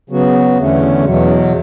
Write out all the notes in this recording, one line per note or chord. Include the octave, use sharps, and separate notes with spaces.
C#3 F#3 B3 F#4
E2 D3 A3 C#4
E2 B2 F#3